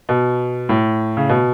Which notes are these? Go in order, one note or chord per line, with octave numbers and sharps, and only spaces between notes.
B2
A2
C#3
B2